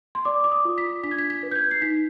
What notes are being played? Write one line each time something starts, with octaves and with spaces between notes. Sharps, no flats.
C6
D5 D6
D6
D#6
F4
B6
D4 B6
G#6
B6
B6
B4
G6
G#6
C7
D#4 B6